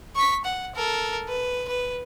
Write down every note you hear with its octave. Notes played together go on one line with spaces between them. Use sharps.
C#6 B6
F#5
A4 A#4
B4
B4